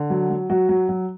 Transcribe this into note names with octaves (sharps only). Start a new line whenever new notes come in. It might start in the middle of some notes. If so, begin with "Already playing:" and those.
Already playing: D3
F#3
F#3
F#3 F#4
F#3
F#3